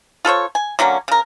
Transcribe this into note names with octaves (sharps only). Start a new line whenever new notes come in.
F4 A4 C5 C#5
G#5
D3 F#3 A#3 C#4
C#3 A#4